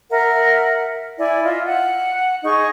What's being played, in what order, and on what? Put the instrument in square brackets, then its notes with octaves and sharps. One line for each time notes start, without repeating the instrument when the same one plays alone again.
[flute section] A#4 E5 F#5
E4 D5 G#5
F4 D#5 E5
F#5
D#4 G#4 D#5 C#6